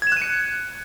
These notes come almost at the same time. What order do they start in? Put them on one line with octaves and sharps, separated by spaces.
G#6 E7 F#6 D#7 C#7